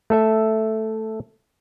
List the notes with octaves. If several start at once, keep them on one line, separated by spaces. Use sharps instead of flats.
A3 A4 E5